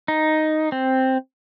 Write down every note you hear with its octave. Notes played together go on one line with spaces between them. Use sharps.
D#4
C4